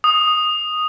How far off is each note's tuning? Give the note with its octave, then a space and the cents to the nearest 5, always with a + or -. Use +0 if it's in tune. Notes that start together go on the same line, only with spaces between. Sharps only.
D#6 -5